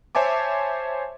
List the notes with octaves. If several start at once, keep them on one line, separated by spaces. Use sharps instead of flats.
C5 C#5 E5 G#5 A5 D6